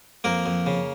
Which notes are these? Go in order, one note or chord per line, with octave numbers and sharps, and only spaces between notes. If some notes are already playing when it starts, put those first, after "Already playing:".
F2 A#3 A#4
F2
C#3